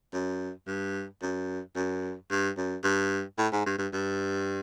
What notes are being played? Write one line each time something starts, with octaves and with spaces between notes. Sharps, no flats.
F#2
G2
F#2
F#2
G2
F#2
G2
A2
G#2
G2
G2
G2